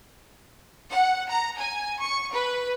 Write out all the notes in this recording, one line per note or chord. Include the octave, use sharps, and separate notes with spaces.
F#5
A#5
G#5
C#6
B4